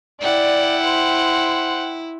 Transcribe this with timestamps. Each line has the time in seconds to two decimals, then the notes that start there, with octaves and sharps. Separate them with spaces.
0.21 E4 D5 F#5 G5
0.84 C5